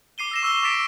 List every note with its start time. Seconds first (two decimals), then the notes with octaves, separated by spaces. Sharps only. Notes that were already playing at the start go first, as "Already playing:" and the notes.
0.18 D6 C7 D#7 G7
0.31 E6 A#6 E7
0.43 C#6 E6 G7
0.63 D6 E6 A6 B6 D7